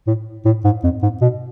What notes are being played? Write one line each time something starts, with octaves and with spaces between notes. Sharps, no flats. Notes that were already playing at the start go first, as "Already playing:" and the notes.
A2
A2
G#2
F2
G#2
B2